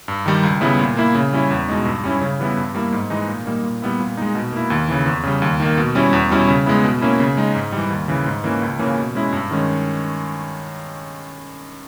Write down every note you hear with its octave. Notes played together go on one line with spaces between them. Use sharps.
G2
D#3 G3
C#2
C#3 G3 B3 E4
A#2
A#3 E4
C#3
G3 C#4 E4
E2
B2 G#3 D#4
G2
G3 C#4 E4
C#3
E3 G3 B3 E4
G2
G3 A#3 E4
G#2
E3 G#3 D#4
A#2
G3 A#3 D#4
A#2
G3 B3 E4
A#2
G#3 D#4
B2
A#3 E4
D#2
C#3 E3
E2
C#3 G3
D#2
D#3 A#3
B2
G3 C#4 E4
E2
B2 G3 C#4 E4
C#3
G#3 B3 E4
B2
A#3 C#4 E4
C#3
G#3 D#4
G#2
E3 G3
D#2
C#3 E3
G#2
E3 A#3 C#4
C#2
C#3 E3 A#3 C#4
B2
G#3 C#4 E4
G2
D#3 G#3 C#4